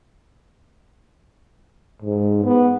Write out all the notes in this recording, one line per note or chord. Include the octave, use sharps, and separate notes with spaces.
G#2
B3